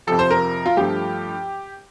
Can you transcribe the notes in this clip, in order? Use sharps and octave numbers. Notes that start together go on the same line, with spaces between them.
F2 C3 F3 A4
C5
A#4
F4
G2 F3 A3 G4